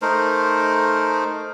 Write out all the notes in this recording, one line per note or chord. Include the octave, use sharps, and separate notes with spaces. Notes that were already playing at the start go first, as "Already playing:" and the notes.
A3 D#4 A#4 C5